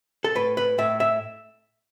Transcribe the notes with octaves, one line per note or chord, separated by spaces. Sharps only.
A4
A2 B4
B4
A2 E5
E5